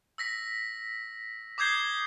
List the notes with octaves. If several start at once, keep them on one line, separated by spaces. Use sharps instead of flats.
E6 A#6 B6
D6 D#6 G6 G#6 C7 G7